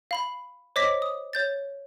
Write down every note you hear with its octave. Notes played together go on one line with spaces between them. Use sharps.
F5 B5 F#7
C5 C#5 D#5 D6 A#6 B6
D#6
C#5 G6 A6